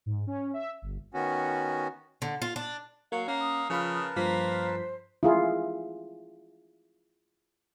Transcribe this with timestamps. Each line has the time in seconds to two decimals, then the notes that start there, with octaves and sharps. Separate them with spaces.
0.06 G#2
0.27 C#4
0.54 E5
0.82 G1
1.14 D#3 B3 C#4 F#4
2.22 D3
2.42 F4
2.56 D4
3.12 F#3 A#3 F5
3.28 A#3 C#4 F#5
3.39 D#6
3.70 C#3 F3 F4 A#4 B4 A5 B5
4.16 G2 F3 A#3 C5 B6
5.23 E4 F4 G#4